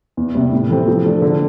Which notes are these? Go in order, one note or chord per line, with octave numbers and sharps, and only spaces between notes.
E2
C3 G3
A2
E3 A3 C4 G4
F3
A3 D4 A4
D3